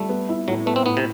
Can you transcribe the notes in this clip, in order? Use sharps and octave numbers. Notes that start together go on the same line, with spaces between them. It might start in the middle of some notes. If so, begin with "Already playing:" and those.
Already playing: G3 A3
B3
E4
A2 F#3
A3 B3
C4
A2 B3
C3